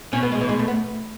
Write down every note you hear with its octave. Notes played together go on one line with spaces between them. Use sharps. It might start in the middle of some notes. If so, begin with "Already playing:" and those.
B2 C#4
B3
G#3
E3
G#3
A3
B3